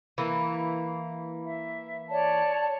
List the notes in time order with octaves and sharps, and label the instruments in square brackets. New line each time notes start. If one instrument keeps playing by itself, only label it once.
[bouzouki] E3 A#3
[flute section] E5
C#5 D5 A5